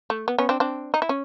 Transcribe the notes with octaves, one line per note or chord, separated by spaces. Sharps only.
A3
B3
B3 C#4
C4 D4
C4 D4
D#4
E4
C#4